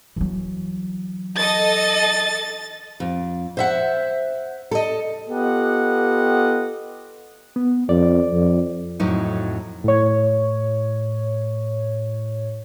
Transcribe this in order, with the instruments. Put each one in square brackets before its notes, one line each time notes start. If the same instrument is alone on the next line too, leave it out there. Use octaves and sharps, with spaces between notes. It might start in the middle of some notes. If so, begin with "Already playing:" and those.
[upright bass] E3 F#3
[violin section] A4 D#5 [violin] A6
[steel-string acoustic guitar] F2
C5 E5 F#5
A4 D#5
[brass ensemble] B3 F4 G4 A4 D#5 F#5
[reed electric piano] B3
[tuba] F2 [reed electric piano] D5
[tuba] F2
[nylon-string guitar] F2 A2 F#3 D#4
[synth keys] A2 C#5